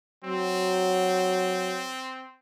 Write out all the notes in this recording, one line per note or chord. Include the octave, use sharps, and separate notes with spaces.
F#3 C4